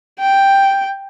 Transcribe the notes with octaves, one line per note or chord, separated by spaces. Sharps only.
G5